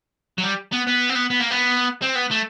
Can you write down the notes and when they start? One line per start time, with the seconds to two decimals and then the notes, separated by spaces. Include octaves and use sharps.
0.38 F#3
0.43 G3
0.72 B3
0.87 B3
1.10 C4
1.15 B3
1.30 B3
1.40 A#3
1.51 B3
2.02 C4
2.16 B3
2.31 A3